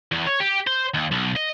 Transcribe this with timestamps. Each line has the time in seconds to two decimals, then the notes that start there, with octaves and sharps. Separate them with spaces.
0.12 E2
0.27 C#5
0.41 G4
0.67 C5
0.94 D#2
1.12 B1
1.36 D#5